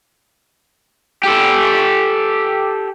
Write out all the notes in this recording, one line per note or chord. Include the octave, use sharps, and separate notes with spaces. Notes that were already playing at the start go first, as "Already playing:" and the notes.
G4 A4